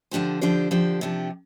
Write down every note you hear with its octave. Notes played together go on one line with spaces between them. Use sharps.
D3 F3 D4 G4 C5
D3 F3 D4 G4 C5
D3 F3 D4 G4 C5
C3 F3 D4 G4